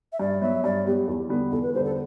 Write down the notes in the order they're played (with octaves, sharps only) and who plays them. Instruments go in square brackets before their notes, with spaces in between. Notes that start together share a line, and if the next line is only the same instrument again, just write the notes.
[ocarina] E5
[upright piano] G2 [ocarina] D5
[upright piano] F#3 B3 [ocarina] E5
[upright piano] G2 [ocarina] D5
[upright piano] F#3 B3 [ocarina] G4
[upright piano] E2
D3 G3 B3
[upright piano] E2 [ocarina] A4
[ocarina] B4
[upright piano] D3 G3 B3 [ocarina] C5
[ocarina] A4